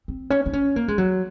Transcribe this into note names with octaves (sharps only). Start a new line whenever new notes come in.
C4
C#4
D#4
C#4
A#3
G#3
F#3